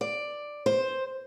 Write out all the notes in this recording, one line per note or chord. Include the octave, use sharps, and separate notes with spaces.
D5
C5